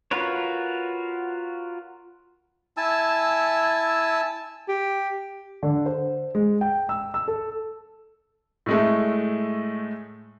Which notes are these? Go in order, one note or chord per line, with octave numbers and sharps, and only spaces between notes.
F4 F#4 A#4 B4 C#5
E4 G#5 A5 E6
G4
D3
C5
G#3
G5
E6
E6
A4
A2 G#3 A3